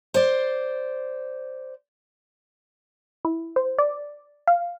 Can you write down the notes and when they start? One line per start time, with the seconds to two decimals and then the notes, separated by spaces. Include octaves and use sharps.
0.14 C5 D5
3.25 E4
3.56 C5
3.78 D5
4.47 F5